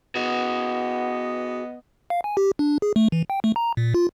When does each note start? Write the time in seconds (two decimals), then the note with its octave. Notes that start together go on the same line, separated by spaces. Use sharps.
0.15 B3 F#4 G#4 D#5
2.10 F5
2.24 G#5
2.37 G4
2.59 D4
2.82 G#4
2.96 A3
3.12 E3
3.30 G5
3.44 A3
3.56 A#5
3.77 A#2
3.94 F4